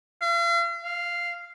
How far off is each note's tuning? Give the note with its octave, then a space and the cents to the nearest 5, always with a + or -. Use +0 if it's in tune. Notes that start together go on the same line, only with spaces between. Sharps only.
F5 -40
F5 -5